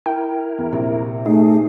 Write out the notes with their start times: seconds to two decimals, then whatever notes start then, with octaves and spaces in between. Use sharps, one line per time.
0.06 E4 A#4 G5
0.58 E2
0.72 A#1 C3
1.26 A3 D#4 G#4